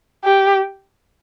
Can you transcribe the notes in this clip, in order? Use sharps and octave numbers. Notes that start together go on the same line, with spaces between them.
G4